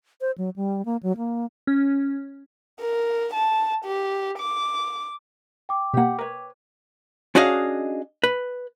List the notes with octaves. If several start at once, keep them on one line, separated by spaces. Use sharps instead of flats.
C5
F#3
G3
A#3
F#3
A#3
C#4
A#4
A5
G4
D6
G5 D6
B2 A#3 G4 F#5
A#4 B4 C#5
C#4 D4 F#4 G#4 D#5 F5
B4